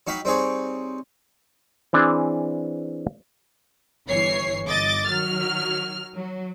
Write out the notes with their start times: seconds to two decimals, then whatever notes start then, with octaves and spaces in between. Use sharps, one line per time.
0.07 F#3 D#4 F5 G5 B5
0.25 G3 C4 D#4 G#4 C#5
1.93 E3 C4 D4 G#4
4.07 G1 E3 C#5 C7
4.66 G1 D#5 D6 A6
5.08 D#3 F#3 F6
6.15 F#3